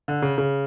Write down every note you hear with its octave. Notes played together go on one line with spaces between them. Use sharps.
D3
C#3
C#3